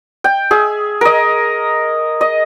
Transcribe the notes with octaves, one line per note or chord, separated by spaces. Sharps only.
G5
G#4 E5
A#4 D#5
D#5